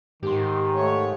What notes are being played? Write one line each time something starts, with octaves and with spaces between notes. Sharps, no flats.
G#2 D#3 G4 C6
A3 C#5